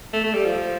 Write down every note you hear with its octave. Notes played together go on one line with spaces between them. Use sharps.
A3
A3
G3
F3